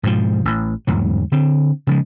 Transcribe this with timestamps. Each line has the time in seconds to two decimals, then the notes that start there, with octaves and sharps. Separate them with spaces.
0.03 G#2 B2 D#3 F3
0.45 A1
0.87 G1 E2 G#2 F#3
1.32 D3 C4
1.87 C#3 F3 G#3